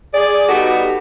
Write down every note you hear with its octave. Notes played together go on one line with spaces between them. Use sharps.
G#4 D5
G3 B3 D#4 F#4 G4 A4